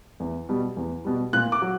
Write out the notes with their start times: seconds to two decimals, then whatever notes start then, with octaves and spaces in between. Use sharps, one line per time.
0.20 E2
0.49 B2 G3
0.77 E2
1.05 B2 G3
1.33 A#2 F#6
1.52 D6
1.62 F#3